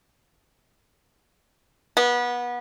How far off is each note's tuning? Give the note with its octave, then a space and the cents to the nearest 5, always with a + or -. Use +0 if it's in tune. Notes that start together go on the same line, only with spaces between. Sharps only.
B3 -25